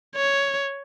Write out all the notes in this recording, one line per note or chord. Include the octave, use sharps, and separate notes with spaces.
C#5